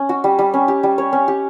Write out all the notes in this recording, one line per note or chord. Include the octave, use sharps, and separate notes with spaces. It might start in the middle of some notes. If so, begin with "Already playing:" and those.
Already playing: C#4
F#4
G3
G3
C#4
G4
G3
C#5
C#4
G4